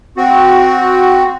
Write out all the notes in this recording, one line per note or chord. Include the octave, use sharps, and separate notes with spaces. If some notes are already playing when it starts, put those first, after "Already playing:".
C4 F#4